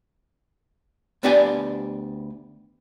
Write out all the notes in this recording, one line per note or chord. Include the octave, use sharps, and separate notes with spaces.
D2 B3 D4 G4 D5 G#5